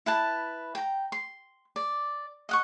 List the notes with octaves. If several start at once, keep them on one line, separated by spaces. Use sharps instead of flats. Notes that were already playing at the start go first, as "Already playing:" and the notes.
E4 B4 A5
G5 A#5
C6
D5
D#5 F#5 C#6